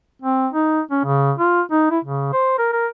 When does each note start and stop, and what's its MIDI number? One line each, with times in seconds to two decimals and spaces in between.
0.22 0.48 60
0.53 0.81 63
0.91 1.01 61
1.05 1.32 49
1.38 1.62 65
1.71 1.87 63
1.91 1.99 64
2.05 2.31 49
2.33 2.57 72
2.58 2.68 70
2.73 2.87 70